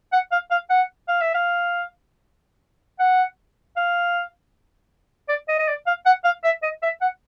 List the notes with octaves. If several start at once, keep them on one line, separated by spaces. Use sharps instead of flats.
F#5
F5
F5
F#5
F5
E5
F5
F#5
F5
D5
D#5
D#5
D5
F5
F#5
F5
E5
D#5
E5
F#5